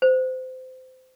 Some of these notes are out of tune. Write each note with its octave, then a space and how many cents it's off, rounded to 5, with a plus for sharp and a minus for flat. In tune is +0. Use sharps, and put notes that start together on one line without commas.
C5 -25